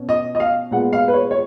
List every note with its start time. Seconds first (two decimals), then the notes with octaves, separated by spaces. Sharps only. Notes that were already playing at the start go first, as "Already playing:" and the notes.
Already playing: B2 C#4
0.09 D#5
0.35 D#5
0.40 F5
0.71 A#2 G#3 B3 F#5
0.93 F5
1.08 B4
1.13 C#5
1.31 C#5